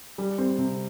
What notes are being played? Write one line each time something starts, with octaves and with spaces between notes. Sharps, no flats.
G3
C4
C3